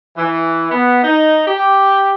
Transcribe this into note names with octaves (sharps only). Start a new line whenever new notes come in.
E3
B3
D#4
G4